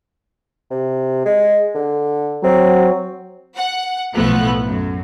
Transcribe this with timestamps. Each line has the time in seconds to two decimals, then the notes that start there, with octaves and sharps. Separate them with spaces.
0.70 C3
1.25 G#3
1.75 D3
2.43 F#3 C4
3.56 F#5
4.14 B1 A2 F3 A3 B3 F#6
4.66 F#2